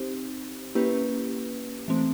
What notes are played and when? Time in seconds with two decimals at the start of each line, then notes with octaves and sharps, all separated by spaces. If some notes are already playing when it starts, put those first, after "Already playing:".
Already playing: C4 D#4 G4 C5
0.75 A#3 C#4 E4 G4 B4
1.88 E3 A3 C4